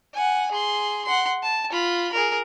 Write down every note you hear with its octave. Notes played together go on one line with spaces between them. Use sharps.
F#5 G#5
G#4 C6
F#5 C6
A5
F4 B5
G#4 A#4